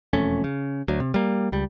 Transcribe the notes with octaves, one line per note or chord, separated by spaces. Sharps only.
E1 F2 A3 C#4
C#3
D2 F#3
C3
G3 A#3
C#2 G3